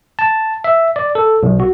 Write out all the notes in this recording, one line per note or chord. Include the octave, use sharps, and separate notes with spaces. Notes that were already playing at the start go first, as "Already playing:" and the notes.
A5
E5
D5
A4
B1
F#4